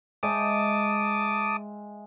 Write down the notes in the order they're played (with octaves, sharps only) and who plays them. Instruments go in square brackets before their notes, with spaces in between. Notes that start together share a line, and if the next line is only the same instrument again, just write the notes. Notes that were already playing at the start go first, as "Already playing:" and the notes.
[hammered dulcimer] G#3 E5 G5 [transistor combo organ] A5 D6 D#6